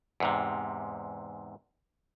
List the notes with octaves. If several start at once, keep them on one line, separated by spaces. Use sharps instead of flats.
E2 G#2 C3